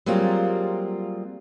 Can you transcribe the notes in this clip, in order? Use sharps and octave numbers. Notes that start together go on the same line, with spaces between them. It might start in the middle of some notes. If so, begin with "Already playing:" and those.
F#3 G3 A#3 C4 F4 G#4